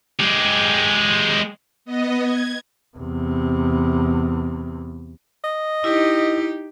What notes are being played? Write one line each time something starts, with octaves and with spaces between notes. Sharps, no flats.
G#3 G4
B3 D#5
G#6
E2 C3
D#5
D#4 E4 G4